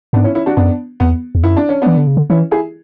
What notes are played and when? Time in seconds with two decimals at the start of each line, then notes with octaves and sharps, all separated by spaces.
0.13 G#2 B3 D4
0.24 C#4 E4
0.35 C#4 E4
0.46 D4 F#4
0.57 F#2 B3 D4
1.00 E2 B3
1.35 E2
1.43 F#2 E4
1.57 D4
1.69 C#4
1.82 E3 B3 D4
1.97 D3
2.07 C#3
2.17 D3
2.30 E3 C#4 E4
2.51 E4 G#4